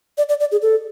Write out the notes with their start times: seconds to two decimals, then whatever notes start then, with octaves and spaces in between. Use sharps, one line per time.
0.18 D5
0.29 D5
0.40 D5
0.52 G#4
0.62 A4